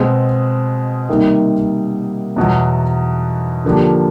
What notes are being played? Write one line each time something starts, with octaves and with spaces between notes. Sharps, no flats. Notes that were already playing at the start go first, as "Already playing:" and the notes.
Already playing: B2 G#3 C4
C3 D#3 G3 A#3 D#4
E2 B2 F#3
D3 F3 A#3 D4 G4